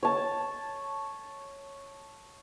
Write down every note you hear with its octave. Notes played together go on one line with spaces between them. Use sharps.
C#5 A5